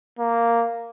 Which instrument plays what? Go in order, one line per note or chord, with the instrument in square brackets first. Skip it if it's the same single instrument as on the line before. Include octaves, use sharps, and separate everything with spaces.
[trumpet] A#3